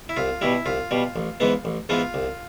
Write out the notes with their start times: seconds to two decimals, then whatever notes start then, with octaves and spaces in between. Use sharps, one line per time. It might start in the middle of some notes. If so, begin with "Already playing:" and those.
0.09 E4
0.17 C2 F4
0.41 B2 G3 E4
0.66 C2 F4
0.91 B2 G3
1.16 A1
1.40 G#2 E3 G#3 B3
1.65 A1
1.89 G#2 E3 G#3 B3 F4
2.14 C2